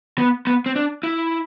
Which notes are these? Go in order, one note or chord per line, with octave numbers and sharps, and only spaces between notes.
B3
B3
C4
D4
E4